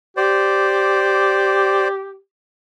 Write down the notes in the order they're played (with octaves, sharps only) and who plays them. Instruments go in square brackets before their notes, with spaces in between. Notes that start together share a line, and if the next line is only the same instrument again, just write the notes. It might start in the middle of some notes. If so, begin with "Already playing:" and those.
[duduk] G4 [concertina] C5 D5